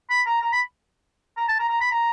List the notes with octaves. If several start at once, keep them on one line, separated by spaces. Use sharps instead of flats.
B5
A#5
A#5
B5
A#5
A5
A#5
A#5
B5
A#5